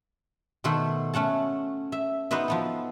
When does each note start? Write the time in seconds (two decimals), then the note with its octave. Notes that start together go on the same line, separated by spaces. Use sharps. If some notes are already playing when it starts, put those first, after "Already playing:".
0.64 B2 D#3 A3 C5 E5 F#5
1.14 A3 C#4 F#5 A5
1.92 E5
2.31 B3 D#4 F#4 B4 C5 E5
2.48 F3 B3 A4